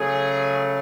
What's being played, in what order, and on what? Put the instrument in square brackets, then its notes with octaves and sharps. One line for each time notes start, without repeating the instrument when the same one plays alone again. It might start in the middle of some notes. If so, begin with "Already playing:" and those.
Already playing: [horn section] C#3 F#3 A3 G#4